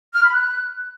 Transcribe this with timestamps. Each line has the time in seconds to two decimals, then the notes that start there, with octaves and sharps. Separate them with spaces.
0.14 F6
0.24 B5
0.34 F#6